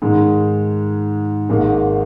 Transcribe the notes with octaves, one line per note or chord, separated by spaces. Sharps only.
G#2 D#3 G#3
G#1 G#2 D#3 A#3